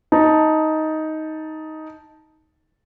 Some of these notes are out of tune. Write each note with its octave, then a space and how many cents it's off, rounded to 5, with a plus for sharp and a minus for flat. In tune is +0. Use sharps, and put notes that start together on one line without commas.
D#4 +10 A5 +0